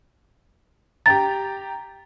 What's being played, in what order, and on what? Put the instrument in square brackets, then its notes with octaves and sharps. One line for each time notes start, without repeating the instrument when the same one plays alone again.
[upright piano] G4 G5 A#5 [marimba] A6